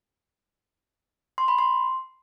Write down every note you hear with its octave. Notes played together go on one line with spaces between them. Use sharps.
C6
B5
C6